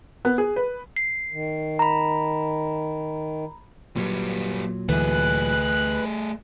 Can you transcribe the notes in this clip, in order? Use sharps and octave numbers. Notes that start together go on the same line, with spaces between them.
B3
G#4
B4
C7
D#3
A#5 B5
A#2 F#3 G3 B3
D2 E3 A3 G#4 B4 F#6